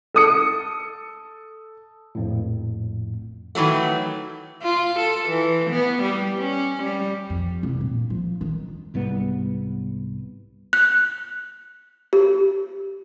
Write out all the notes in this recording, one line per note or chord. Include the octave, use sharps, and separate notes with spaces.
A4 D#6 C#7
A#1 F2 A2
D#3 E3 F#3 A3
F4
A4
E3
B3
G3
C#4
G3
F2
C2
A#2
F3
D#3
C2 G#2 G3 B3
F#6
G4